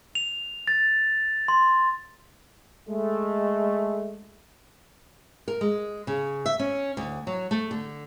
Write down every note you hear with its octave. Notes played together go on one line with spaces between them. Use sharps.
F7
A6
C6
G#3 A3
A#4
G#3
C#3
E5
C#4
D2
F#3
A3
D3